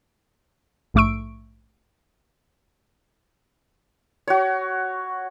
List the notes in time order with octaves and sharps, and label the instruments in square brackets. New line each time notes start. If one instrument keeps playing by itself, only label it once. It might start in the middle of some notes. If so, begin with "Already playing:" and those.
[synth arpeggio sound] A#1 G#2 A3 C#6 E6 D7
[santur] F#4 C#5